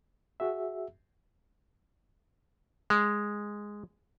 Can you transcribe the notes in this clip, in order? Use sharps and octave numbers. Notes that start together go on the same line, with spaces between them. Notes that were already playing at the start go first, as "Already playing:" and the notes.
F#4 G#4 E5
G#3